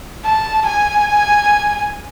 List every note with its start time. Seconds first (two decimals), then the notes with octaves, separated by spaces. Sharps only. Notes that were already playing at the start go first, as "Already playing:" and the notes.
0.24 A5
0.67 G#5